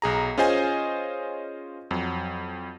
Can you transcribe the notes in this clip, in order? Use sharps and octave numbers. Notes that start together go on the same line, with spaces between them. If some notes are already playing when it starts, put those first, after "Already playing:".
B1 G#4 A#5
C#4 F4 G#4 C5 D#5 G#5
F2 F#3